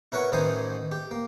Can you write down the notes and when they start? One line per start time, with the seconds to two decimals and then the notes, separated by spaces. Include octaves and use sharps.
0.12 E4 A#4 B4 C#5 F#5
0.32 A1 D#3 E3 D#4 C5 G#5
0.92 G4
1.11 A#3